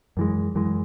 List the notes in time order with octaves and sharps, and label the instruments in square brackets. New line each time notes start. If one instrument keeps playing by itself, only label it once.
[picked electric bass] F#2 E3 G#3
F#2 E3 G#3